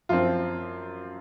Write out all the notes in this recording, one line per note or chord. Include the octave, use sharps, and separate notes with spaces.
F#2 F3 C4 F4